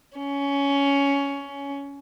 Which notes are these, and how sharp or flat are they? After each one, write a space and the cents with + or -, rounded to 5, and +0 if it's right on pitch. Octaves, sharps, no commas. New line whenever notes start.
C#4 +15